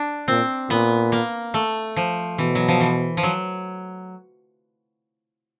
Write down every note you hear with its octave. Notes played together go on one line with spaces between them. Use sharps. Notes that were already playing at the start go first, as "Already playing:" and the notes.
Already playing: D4
A#2 C4
A#2 B3
A#3
A3
F3
B2 E3
F#3
F3
E3
F3
F#3